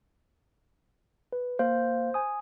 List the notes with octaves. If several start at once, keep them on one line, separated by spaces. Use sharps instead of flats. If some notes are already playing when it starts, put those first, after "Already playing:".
B4
A#3 C5 F5
G#5 D#6